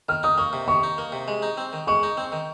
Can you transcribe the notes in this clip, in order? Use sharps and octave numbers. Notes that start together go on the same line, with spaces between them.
D#3 F6
D#4 D#6
A#3 C#6
C3
D#3 C#6
D#4
A#3
C3
G#3
D#4
C4
D#3
G#3 C#6
D#4
C4
D#3